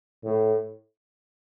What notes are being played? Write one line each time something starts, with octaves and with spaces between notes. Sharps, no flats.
A2